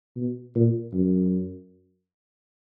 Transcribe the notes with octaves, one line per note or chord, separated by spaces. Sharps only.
B2
A#2
F#2